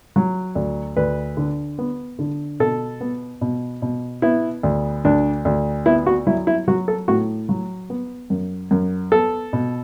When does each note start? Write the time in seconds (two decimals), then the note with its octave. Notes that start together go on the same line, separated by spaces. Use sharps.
0.16 F#3
0.55 D2
0.97 D2 B4
1.37 D3
1.78 B3
2.19 D3
2.60 B2 A4
3.01 B3
3.41 B2
3.82 B2
4.22 B3 E4
4.63 D2
5.05 D2 D4
5.45 D2
5.86 B3 E4
6.06 F#4
6.27 F#3 E4
6.47 E4
6.68 F#3 F#4
6.88 A4
7.08 A2 F#4
7.49 F#3
7.90 B3
8.30 F#2
8.71 F#2
9.12 B3 A4
9.53 B2